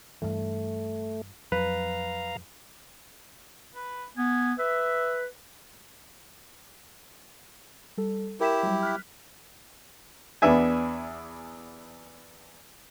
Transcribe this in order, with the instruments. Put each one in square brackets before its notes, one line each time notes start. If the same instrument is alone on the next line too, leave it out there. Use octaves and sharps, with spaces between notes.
[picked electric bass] G2 E3 [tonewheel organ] A3
[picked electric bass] F2 F#3 [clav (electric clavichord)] B4 [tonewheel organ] F5 A#5
[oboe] B4
[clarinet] B3 [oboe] G#5
[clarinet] B4 [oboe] E5
[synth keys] G3 A4
[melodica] E4 G4 [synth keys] A#4 B6 E7
[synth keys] F#3 G3
F6 F#6 B6
[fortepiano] E2 B3 D4 E5 G#5